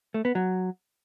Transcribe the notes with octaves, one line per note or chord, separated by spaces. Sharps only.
A3
B3
F#3